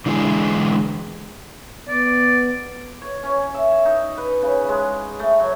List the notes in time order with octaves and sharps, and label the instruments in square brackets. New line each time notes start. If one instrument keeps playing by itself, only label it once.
[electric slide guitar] D3 E3 G#3 G#4
[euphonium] B3 [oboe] D5
[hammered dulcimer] C#5
C#4
E5
D#4
B4
C#3
G#3
A3
F#3